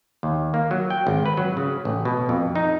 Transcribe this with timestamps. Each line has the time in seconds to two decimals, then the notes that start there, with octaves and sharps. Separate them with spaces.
0.23 D#2
0.54 A#3
0.71 F#3
0.90 G5
1.07 G#1
1.26 B4
1.37 F#3
1.57 C#3
1.85 A1
2.05 B2
2.29 F2
2.55 D#4